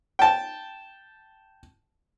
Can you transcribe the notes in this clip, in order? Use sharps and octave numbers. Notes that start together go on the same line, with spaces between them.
G5 A5